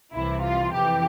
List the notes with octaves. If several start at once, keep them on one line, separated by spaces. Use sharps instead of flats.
C2 C3 E3 E4
F4
F2 E3 G4